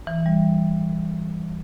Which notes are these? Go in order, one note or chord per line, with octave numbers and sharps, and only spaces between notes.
E3
G3